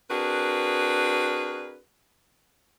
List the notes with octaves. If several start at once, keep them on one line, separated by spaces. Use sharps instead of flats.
C4 D4 F#4 G#4 A#4 B4